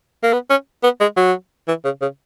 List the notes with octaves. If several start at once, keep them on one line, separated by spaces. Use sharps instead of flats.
A#3
B3
C#4
B3
G#3
F#3
E3
C#3
C#3